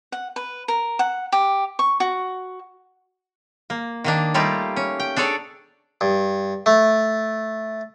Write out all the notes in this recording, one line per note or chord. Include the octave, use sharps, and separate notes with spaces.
F#5
B4
A#4
F#5
G4
C#6
F#4
A#3
D#3 A#3 D4
G3 A3 A#3 D#4 F4 G4
C#4
G5
D4 G#4 A4 C#5 D5
G2
A3